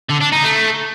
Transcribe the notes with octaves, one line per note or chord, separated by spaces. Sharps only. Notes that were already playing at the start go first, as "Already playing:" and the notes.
D3
D4
D#4
A3